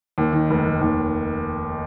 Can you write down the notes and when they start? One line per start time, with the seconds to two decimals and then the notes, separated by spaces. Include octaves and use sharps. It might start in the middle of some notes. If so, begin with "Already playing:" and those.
0.18 D#2
0.33 D#3
0.50 F1
0.66 F1
0.81 D#2